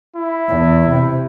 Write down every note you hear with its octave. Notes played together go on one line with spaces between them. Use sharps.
E4
E2
C3